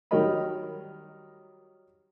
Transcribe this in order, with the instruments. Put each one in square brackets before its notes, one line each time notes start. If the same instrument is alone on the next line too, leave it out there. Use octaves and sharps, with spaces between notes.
[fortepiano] D#3 F#3 G3 A#4 D#5 B5